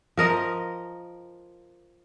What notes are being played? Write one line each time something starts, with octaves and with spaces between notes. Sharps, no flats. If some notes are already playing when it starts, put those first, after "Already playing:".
F3 A#4 D#5